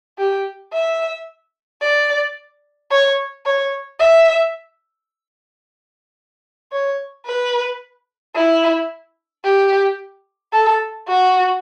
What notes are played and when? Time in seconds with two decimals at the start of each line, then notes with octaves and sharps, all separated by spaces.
0.18 G4
0.73 E5
1.81 D5
2.91 C#5
3.46 C#5
3.99 E5
6.72 C#5
7.26 B4
8.35 E4
9.44 G4
10.53 A4
11.08 F#4